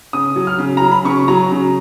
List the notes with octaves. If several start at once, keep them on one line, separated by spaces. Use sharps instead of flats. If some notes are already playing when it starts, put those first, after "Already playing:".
C#3 D#6
F#3
F6
C#3
F#3 A#5
B5
C#3 C#6
F#3 A#5
C#3